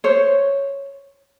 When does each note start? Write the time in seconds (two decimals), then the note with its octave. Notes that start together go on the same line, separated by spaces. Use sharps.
0.04 C5 C#5